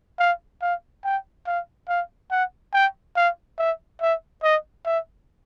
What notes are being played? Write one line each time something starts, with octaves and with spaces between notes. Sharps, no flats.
F5
F5
G5
F5
F5
F#5
G5
F5
E5
E5
D#5
E5